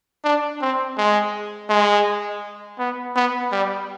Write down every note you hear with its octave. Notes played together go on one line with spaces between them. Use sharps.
D4
C4
G#3
G#3
B3
B3
G3